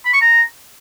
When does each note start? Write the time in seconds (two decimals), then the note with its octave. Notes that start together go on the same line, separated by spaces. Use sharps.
0.05 B5
0.13 C#6
0.21 A#5